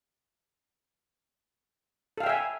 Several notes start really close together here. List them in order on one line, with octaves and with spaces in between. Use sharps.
A4 F5 G5 E5 G#5